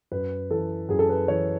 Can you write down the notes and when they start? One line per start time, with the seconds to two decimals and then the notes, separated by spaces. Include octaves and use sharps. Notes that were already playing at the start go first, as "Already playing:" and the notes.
0.12 F#2 B4
0.51 E3 A4
0.89 F#2 G#4
0.99 A4
1.09 B4
1.28 E3 C#5